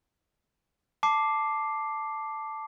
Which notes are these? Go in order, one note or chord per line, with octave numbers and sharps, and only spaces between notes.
A5 D6 C7